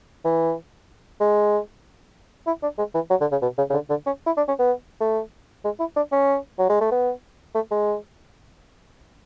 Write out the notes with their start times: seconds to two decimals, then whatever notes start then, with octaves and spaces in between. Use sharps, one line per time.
0.25 E3
1.20 G#3
2.47 E4
2.63 D4
2.78 G#3
2.95 E3
3.10 F#3
3.21 D3
3.32 C#3
3.42 B2
3.58 C#3
3.70 C#3
3.74 D3
3.89 D3
4.06 C#4
4.26 E4
4.37 D4
4.48 C#4
4.59 B3
5.01 A3
5.65 G#3
5.80 E4
5.96 D4
6.12 C#4
6.59 F#3
6.69 G#3
6.81 A3
6.91 B3
7.55 A3
7.71 G#3